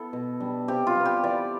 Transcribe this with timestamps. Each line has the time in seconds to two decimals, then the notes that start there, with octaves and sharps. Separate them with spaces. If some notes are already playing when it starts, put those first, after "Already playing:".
Already playing: B3 E4 A4
0.13 B2
0.40 G3 D4
0.68 C3 G4
0.87 F4
0.95 G3 B3
1.05 G4
1.24 E3 D5